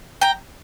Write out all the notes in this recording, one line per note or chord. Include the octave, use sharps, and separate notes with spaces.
G5 A#5